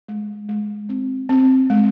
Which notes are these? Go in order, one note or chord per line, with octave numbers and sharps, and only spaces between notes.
G#3
G#3
C4
C4
G#3